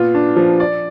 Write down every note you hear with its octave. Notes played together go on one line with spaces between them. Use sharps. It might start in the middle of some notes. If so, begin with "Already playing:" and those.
Already playing: A#2 B3 F4
D4
F3
D5